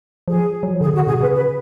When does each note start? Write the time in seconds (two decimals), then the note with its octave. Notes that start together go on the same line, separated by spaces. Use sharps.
0.27 F3 G#4
0.63 F#3
0.74 F3
0.81 D3 G#4
0.94 D3 F#4
1.07 B2 G#4
1.21 C#3 B4
1.34 B4